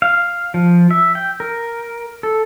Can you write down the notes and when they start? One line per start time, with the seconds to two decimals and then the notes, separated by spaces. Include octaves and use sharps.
0.02 F5
0.54 F3
0.91 E5
1.15 G5
1.40 A#4
2.23 A4